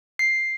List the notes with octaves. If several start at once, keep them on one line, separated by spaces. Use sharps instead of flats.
C7